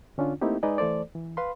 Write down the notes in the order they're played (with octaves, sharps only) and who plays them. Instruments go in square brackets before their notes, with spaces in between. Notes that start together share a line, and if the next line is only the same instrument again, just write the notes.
[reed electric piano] D3 C#4 D4 F4
A3 A#3 C4 D#4 E4 G4
G#3 D#4 B4 D5 D#5 G#5
E3 A3 A4 C5 D5
E3
B4 F5 B5 C6